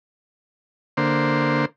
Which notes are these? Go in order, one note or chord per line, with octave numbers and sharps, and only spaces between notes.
D3 A#3 C5